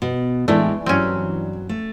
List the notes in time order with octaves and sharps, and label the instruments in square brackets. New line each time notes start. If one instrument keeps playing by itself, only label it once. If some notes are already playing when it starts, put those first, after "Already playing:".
[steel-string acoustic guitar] B2
[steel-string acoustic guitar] A2 G#3 [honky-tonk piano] E3 D4 [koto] A3
[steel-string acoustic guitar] G2 F#3 [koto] C4 C#4
[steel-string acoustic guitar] A3